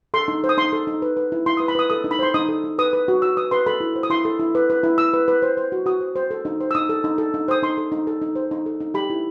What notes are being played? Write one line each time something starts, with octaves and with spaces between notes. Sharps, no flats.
A4 C6
D#4
C5
D#6
D#4 C6
A4
D#4
B4
B4
E4
E4 C6
D#6
B4
B5
B4 D#6
A4 D#6
D#4
B5
C5 C6
D#4 D#6
A4
D#4
B4 D#6
B4
F#4
F#4 E6
B4 D#6
B4 C6
A4 B5
E4
C5
D#6
E4 C6
A4
E4
B4
B4
E4
E4 E6
B4
B4
C5
C5
F#4
F#4 D#6
C5
C5
A4
D#4
C5
E6
D#4 D#6
A4
D#4
A4
D#4
C5 D#6
D#4 C6
A4
D#4
A4
D#4
C5
D#4
A4
D#4
G4 B5
E4